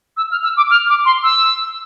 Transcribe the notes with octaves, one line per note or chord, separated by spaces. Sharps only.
E6
F6
E6
D6
F6
D6
C6
E6